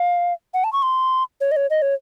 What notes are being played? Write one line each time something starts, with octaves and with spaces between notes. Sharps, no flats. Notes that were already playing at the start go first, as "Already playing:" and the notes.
Already playing: F5
F#5
A5
C#6
C6
C#5
D#5
C#5
D#5
C#5